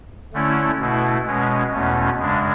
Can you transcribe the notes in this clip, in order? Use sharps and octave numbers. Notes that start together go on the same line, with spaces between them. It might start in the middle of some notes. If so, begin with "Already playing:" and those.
D3 A3 C#4 E4
B2 A3 E4
B2 G#3 C#4
E2 B2 A3 C#4
F#2 C#3 G#3 D4